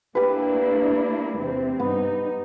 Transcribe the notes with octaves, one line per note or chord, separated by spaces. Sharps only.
A#3 D4 E4 G4 B4
E2 C3 C4
G2 B3 D#4